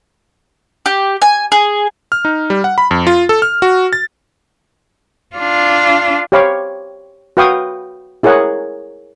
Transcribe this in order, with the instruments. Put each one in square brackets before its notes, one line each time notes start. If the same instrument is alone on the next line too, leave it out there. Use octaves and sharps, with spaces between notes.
[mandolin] G4
G#5
G#4
[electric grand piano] F6
D#4
G3
F#5
B5
F2
F4
A4
F6
F#4
A6
[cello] D4 F4
[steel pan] G4 C5 C#5 F5 B5 D6
F#4 B4 F5 G5 C#6 D#6
E4 G#4 A#4 C#5 F#5